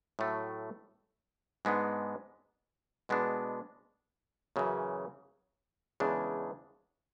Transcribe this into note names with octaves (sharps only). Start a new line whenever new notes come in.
A2 F#3 A3
G#2 G#3 B3 D4
B2 G#3 B3 D4
F#2 C#3 E3
E2 C#3 G#3 D4